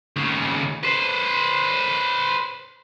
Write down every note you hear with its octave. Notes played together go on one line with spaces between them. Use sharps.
D#2 C#3
B4 C5